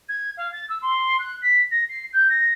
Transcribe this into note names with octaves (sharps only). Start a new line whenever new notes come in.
G#6
F5
A6
E6
C6
F#6
B6
A#6
C7
G6
A#6